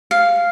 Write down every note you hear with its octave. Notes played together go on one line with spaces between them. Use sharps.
F5